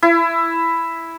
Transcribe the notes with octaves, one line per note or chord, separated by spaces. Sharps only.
E4